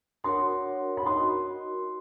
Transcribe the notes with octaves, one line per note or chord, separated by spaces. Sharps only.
D4 F#4 A#4 C#5 F#5 C6
B5
D#4 F#4 A#4 D#5 C6